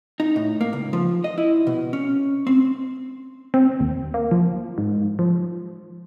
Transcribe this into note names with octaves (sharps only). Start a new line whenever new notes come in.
D#4
A2
A#3
C#2
F3
D#5
E4
B2
C#4
C4
C4
D#2
A#3
F3
G#2
F3